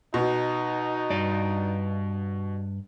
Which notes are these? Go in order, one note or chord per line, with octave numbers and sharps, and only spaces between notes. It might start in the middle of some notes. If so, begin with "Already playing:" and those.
B2 D#4
G2 D5